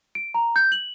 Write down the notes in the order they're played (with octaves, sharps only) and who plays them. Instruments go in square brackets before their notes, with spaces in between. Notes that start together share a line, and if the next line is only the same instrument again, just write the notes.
[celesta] D7
A#5
G6
F#7